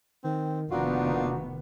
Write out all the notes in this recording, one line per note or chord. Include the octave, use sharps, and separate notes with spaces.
D#3 C4
F1 D#3 A#3 B3 D4 D#4 F4 F#4